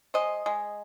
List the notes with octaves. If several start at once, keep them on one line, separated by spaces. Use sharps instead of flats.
G#3 C5 D#5
G#3